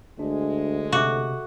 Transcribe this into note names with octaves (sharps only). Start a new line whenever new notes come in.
D2 G#3 D4
C3 F#4 A4 E5 D6